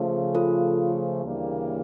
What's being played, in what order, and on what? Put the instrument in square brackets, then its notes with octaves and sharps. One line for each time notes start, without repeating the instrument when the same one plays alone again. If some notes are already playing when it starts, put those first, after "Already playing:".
Already playing: [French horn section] C#3 F3 A3
[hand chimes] F4 A4
[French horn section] D2 C#3 E3 G3 A#3